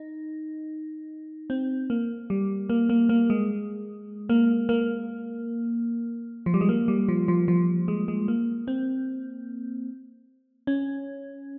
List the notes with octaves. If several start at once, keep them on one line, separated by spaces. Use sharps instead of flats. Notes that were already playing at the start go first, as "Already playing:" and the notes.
Already playing: D#4
C4
A#3
G3
A#3
A#3
A#3
G#3
A#3
A#3
F3
G3
G#3
A#3
G3
F3
F3
F3
G#3
G#3
A#3
C4
C#4